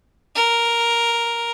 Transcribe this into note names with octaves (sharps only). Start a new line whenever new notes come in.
A#4